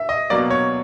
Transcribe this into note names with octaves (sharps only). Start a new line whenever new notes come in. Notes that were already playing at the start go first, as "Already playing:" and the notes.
Already playing: E5
D#5
B2 F#3 A#3 D5
C#5